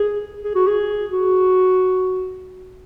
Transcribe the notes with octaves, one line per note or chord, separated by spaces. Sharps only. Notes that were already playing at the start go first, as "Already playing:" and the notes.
Already playing: G#4
G#4
F#4
G#4
F#4